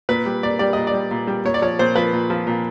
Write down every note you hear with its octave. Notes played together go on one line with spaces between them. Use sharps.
A#2 B4
G3
A#2 D5
G3 D5
A#2 D#5
D5
G3
A#2
G3
A#2 C#5
D5
F3 C#5
A#2 C5
F3 B4
A#2
F3
A#2